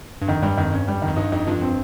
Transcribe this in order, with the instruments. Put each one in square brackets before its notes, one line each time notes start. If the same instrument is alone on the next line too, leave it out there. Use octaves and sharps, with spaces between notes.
[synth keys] G2
[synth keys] F2 [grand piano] D#3
[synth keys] G2 [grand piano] G3
[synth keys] F2 [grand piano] D#3
[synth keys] G2 [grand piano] C#4
[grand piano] G3
D#3
[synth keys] F2
[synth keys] G2 [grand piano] D#4
[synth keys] F2 [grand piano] D#4
[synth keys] G2 [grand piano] F3
[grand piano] C4